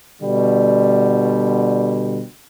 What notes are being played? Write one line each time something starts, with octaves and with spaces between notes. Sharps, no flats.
B2 D3 G3